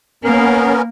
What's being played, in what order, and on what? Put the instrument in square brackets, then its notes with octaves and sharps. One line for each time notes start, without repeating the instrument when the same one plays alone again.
[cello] A#3 [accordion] B3 C#4 A#4